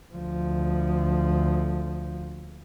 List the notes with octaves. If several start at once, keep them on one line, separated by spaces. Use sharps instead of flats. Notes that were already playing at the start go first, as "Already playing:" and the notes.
D2 F3